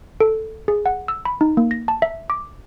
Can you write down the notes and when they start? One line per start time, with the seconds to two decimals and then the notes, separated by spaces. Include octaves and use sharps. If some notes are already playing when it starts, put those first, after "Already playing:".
0.20 A4
0.68 G#4
0.86 F#5
1.08 E6
1.25 B5
1.41 D#4
1.57 A#3
1.71 A#6
1.88 A5
2.02 E5
2.30 D6